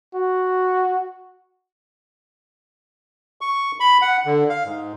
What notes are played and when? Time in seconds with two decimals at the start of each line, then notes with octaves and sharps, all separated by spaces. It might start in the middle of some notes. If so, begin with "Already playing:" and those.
0.15 F#4
3.41 C#6
3.80 B5
4.02 F#5
4.26 D3
4.49 F5
4.65 G#2